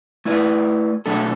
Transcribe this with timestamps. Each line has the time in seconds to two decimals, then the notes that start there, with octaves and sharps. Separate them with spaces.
0.25 A3 E4 B4 D5
1.06 B2 F#3 A3 D4 A4